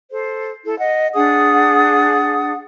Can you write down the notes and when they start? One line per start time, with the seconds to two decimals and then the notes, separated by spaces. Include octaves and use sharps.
0.11 A4 C5
0.64 E4 A4
0.78 D#5 F#5
1.15 D4 G#4 F#5 D#6